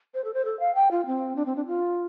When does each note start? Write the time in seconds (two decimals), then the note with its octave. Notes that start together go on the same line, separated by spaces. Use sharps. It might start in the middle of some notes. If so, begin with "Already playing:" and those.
0.14 C5
0.24 A4
0.34 C5
0.45 A4
0.60 F5
0.75 G5
0.91 F4
1.06 C4
1.36 D4
1.46 C4
1.56 D4
1.67 F4